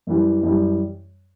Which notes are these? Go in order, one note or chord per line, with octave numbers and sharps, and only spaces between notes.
F#2 E3 G3
F#2 E3 G3